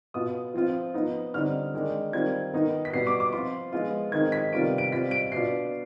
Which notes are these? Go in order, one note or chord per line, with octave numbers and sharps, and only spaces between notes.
B2 B3 F4 D#6
F3 C4 F4
F3 B3 D#4
D3 G3 C4 D#4 F6
D#3 G#3 D4
D#3 G3 C4 F4 G#6
D#3 B3 D#4
B6
B2 G3 B3 C7
D6
D6
F3 C4 F4 C6
F3 G#3 B3 F4
D#3 G#3 C4 D#4 G#6
B6
C3 D#3 G3 B3 F4 D7
D7
G3 C4 F4 B6
D7
B2 B3 D4 F4 C7